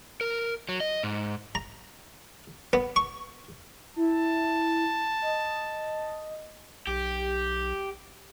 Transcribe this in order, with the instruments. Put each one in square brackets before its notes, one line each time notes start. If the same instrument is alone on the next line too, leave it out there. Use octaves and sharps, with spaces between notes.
[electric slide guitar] A#4
F#3
D#5
G#2
[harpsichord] A#5
B3
C#6
[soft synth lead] E4 [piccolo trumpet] A5
[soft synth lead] D#5
[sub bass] B1 [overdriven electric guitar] G4